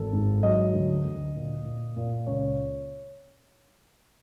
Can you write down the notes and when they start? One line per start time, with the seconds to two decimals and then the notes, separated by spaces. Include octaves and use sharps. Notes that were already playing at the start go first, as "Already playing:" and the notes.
Already playing: G#1 A4
0.13 G#2
0.43 F#3 D#5
0.74 D2
1.04 D2
1.35 A#2
1.65 A#2
1.96 A#2
2.27 C#2 C#5